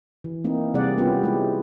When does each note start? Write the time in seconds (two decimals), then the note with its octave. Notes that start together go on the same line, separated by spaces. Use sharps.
0.24 E3
0.44 A#3 C4 D#4 E4
0.74 C3 G3 C4 G#4 D5 F#5
0.98 B3 C#4 F4 G4
1.23 G#3 E4 G4